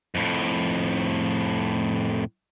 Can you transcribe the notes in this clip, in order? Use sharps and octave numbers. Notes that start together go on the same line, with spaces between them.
F2 A2